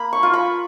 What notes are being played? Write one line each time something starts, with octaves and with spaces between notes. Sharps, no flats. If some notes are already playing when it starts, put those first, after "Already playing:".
Already playing: A#3 B5
C#6
F4
B5